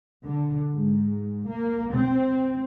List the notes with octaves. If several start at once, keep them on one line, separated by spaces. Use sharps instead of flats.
D3
G#2
A#3
C4